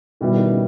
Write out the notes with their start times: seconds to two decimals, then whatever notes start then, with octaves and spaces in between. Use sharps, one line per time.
0.21 B2 D#3 G3 B3 E4
0.36 D#3
0.50 C#3